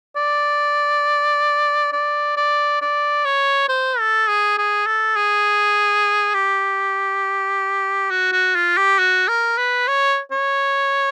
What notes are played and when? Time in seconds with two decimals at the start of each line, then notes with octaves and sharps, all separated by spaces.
0.16 D5
1.93 D5
2.37 D5
2.81 D5
3.25 C#5
3.69 C5
3.99 A4
4.28 G#4
4.58 G#4
4.87 A4
5.17 G#4
6.34 G4
8.11 F#4
8.32 F#4
8.55 F4
8.77 G4
8.99 F#4
9.28 A#4
9.58 B4
9.88 C#5
10.32 C#5